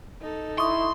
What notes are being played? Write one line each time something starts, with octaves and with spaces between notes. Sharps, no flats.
D#4 A4
E4 C6 C#6 D#6